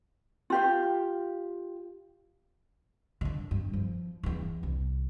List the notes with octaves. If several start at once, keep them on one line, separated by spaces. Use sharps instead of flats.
F4 G4 F5
D3 D#3
G2
F3
E2 E3
C2